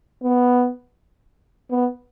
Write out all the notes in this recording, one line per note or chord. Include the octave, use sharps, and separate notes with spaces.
B3
B3